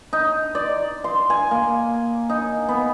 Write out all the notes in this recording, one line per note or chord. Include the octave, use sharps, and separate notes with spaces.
D#4
D5
C6
G#5
A#3
D#4
B3